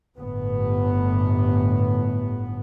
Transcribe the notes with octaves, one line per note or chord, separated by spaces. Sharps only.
G1 A2 B3